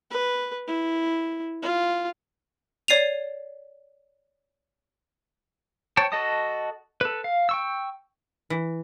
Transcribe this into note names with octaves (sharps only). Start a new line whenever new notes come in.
B4
E4
F4
C#5 D5 C7 D#7 F7
C5 C#5 G5 A5
F#4 A4 D#5 A5 D#6
A4 B4
F5
G5 C#6 E6
E3